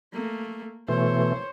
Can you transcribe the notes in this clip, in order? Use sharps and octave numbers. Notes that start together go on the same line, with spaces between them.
A3 A#3
B2 E3 A3 C5 C#5